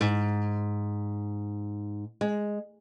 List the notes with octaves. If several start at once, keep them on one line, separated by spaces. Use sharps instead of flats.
G#2
G#3